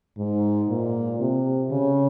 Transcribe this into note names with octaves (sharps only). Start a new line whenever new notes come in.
G#2
A#2
C3
C#3